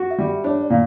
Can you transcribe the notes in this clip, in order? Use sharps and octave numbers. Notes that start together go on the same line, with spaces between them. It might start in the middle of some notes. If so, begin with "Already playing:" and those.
Already playing: F#4
E5
G3
E5
D4 C#5
D5
A#2